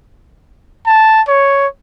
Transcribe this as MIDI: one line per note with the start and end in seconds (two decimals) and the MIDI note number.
0.87 1.22 81
1.28 1.67 73